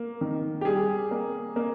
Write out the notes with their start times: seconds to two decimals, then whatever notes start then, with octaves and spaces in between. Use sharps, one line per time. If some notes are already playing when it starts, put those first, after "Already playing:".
Already playing: A#3
0.21 D#3
0.61 G4
0.65 G3 G#4
1.11 A#3
1.56 A#3